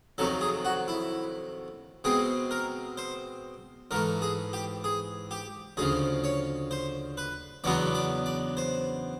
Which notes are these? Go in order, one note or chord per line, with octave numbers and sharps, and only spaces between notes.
F2 C3 D#3 F#3 A4
G#4
F#4
E4
B2 G#3 C4 G#4
A#4
C5
G#2 E3 A3 A#4
G#4
G4
G#4
G4
D2 C#3 F3 G#4
C#5
C5
B4
E2 C#3 F#3 B3 D4 D5
D5
D5
C5